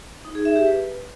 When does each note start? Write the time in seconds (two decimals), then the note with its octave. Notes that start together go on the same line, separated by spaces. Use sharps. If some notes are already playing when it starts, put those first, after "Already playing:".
0.25 D#4
0.35 G#4
0.45 E5
0.56 G4
0.66 B4